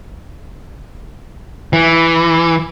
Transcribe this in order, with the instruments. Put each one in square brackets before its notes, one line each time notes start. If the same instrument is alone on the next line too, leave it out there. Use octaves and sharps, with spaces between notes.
[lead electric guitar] E3